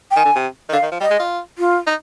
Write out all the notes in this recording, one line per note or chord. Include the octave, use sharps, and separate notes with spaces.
G5
D#3 G#5
D3
C3
D#3
D3 F5
D#3
F3
G3 D#5
G#3
F4
F4
D#4